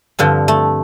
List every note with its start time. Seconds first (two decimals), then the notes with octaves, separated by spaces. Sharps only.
0.19 G2 D3 F3 C4
0.48 A3